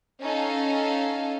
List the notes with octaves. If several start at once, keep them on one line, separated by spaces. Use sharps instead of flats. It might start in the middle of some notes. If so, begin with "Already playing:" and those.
C#4 D#4 A4 F5